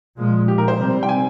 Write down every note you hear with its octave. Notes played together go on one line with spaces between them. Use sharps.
A#2 F3 G#3
G4
A#4
C5
C3 G3 C4
G5
G#5